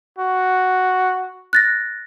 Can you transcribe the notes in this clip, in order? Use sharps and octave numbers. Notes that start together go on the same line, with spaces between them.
F#4
F#6 A6 A#6